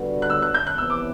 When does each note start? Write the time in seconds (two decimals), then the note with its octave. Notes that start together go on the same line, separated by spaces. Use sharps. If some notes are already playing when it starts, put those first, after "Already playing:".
Already playing: D3 G3 B3 F#4 B4
0.22 F#6
0.30 E6
0.42 F#6
0.54 G6
0.67 F#6
0.78 C3 E3 B3 E6
0.90 D6